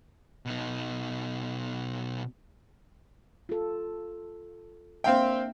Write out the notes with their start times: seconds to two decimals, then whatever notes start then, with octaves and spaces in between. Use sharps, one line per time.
0.46 B2 D#4
3.49 F4 A4
5.04 A#3 C4 D4 E5 F5 G5